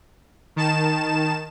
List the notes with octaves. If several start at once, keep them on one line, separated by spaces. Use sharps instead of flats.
D#3 A5 E7